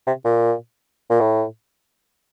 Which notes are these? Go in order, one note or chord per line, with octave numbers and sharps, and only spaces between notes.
C3
A#2
A#2
A2